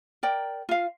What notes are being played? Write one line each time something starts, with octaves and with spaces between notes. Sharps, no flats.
A#4 D5 G5
F4 F5